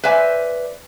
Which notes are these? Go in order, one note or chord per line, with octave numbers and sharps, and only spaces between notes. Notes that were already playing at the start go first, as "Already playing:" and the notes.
B4 C5 D5 E5 G#5